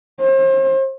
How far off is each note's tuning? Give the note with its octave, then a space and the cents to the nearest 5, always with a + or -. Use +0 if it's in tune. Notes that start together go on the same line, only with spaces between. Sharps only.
C5 +40